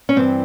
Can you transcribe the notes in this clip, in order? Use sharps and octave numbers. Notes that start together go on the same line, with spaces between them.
C#4
G2 E3 C4